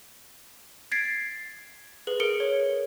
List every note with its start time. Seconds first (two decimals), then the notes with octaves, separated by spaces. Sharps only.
0.92 G#6 A6 B6 C7 D7
2.07 G#4 B4 F#7
2.20 G#4 A#4 C#7 D7 G7
2.40 C#5